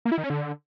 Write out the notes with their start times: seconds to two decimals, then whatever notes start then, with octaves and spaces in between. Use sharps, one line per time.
0.05 A#3
0.12 E4
0.18 D#3
0.24 C#4
0.30 D3